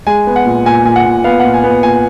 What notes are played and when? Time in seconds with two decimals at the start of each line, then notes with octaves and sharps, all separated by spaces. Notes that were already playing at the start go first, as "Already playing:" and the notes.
0.07 G#3 G#5
0.27 B3
0.36 F#5
0.46 A#2
0.65 A#2 G#5
0.85 A#2 G#5
0.96 F#5
1.06 A#2
1.24 B3 F5
1.40 F#5
1.45 A#2
1.54 G#5
1.64 B3
1.83 A#2 G#5